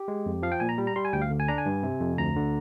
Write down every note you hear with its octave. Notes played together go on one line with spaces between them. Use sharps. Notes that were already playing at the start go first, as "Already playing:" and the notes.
Already playing: G4
G#3
F2
F3 F5
G5
A#2 G#5
A#5
G3
A#5
G3 C6
G#5
D2 G5
F5
D3
G#5
D4 A#5
G#5
G2
C3
F2
D2 A#5
D3